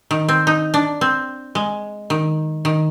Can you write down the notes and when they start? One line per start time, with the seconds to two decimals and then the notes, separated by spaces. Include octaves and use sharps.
0.11 D#3
0.29 C4
0.47 D#4
0.74 D4
1.01 C4
1.55 G#3
2.10 D#3
2.65 D#3